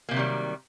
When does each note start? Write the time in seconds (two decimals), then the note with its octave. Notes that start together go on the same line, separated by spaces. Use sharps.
0.09 A#3
0.11 C3
0.14 F#3
0.16 D#3
0.19 G3